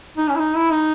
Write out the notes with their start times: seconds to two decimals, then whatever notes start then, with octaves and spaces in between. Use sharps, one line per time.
0.17 D#4
0.29 C#4
0.36 E4
0.39 D#4
0.55 E4
0.72 D#4